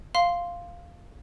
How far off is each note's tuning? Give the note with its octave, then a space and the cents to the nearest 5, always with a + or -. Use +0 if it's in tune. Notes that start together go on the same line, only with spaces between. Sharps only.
F5 +0 C6 +0